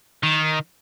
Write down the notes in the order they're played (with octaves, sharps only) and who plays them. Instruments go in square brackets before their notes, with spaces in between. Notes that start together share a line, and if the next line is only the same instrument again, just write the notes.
[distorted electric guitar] D#3